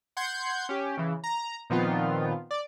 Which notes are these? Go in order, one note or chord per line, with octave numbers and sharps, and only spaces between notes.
F#5 C6 G6 G#6
C#4 G4
C#3 E3
A#5
A#2 D#3 F3 B3 C4 F4
D5